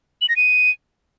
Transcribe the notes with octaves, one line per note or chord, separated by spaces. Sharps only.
F#7
A#6
D#7